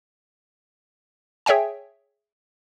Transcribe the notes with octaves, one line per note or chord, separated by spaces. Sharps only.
G#4 C#5 E5 G5 G#5